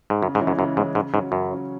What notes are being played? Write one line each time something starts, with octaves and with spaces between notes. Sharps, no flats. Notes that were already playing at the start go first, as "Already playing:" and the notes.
G#2
F#2 C#3
G#2
E3 G#3 C#4 E4
F#2
F#2 C#3
G#2 E3 G#3 C#4 E4
G#2 C#3
G#2 C#4
F#3
F#2 C#3
F#3 C#4